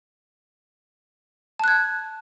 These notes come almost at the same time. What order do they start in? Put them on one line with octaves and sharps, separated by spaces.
A5 F#6 G#6